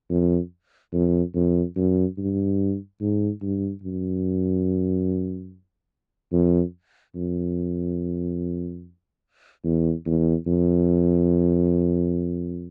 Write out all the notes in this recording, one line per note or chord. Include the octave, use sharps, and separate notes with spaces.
F2
F2
F2
F#2
G2
G#2
G2
F#2
F2
F2
E2
E2
F2